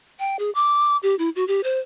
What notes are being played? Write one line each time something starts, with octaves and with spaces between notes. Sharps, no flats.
G5
G#4
D6
G4
E4
F#4
G4
C5